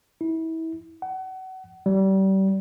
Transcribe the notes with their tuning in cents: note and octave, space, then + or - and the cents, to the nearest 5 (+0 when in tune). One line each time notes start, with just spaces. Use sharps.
E4 -30
F#5 +30
G3 -30